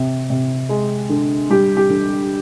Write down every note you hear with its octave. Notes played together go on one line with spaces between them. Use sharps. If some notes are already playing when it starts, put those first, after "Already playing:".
Already playing: C3
C3
G#3
D3
G3 G4
G4
D3